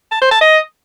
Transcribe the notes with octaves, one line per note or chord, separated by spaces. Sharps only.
A5
C5
A5
D#5